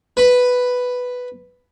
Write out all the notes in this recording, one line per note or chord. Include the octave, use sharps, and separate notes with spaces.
B4 B5